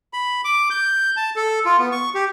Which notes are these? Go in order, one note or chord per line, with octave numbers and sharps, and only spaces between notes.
B5
D6
G6
A5
A4
F4
B3
C#6
G4